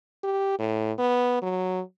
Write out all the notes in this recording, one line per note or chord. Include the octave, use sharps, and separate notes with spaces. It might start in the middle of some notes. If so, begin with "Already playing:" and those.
G4
A2
B3
F#3